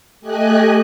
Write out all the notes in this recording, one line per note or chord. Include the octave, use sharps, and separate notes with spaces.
A3 G4 D#5 G#5 F#6